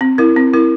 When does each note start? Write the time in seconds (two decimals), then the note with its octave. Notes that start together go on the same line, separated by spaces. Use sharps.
0.01 C4
0.18 E4 A#4
0.36 C4
0.54 E4 A#4